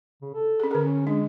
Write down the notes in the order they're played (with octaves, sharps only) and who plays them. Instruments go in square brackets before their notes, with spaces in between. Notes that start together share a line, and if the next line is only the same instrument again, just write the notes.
[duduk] C#3
A4
[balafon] C#4 G#4
[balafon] D3 G#4 [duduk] A#4
[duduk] C#4
[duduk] G#3 [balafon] D4